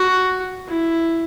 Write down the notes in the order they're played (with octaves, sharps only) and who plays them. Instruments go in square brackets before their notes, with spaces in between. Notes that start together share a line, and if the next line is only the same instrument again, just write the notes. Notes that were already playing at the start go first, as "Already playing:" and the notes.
Already playing: [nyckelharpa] F#4
E4